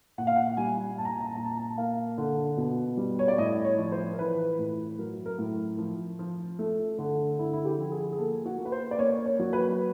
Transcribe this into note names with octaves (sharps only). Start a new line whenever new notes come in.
A#2 F#5
F5
F#5
G3 G#5
A#2 A5
A#5
A5
A#5
A5
A#2 A#5
A5
A#5
A5
A#3 F5
D3
B2
G3
C#5
D5
A2 D#5
C#5
F3
C5
A#4
E3 B4
A2
F#3 A#4
A#4
A2
F3
F3
A3
D3
D3 E4
E4
G4
F3
G#4
G#4
A#3 A4
F#4
A#3
B4
C5
D5
A#3 C#5
C#5
F#3
B4